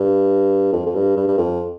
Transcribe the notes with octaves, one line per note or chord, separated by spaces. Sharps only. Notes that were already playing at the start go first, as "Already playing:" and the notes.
Already playing: G2
F2
F2
G2
G2
G2
F2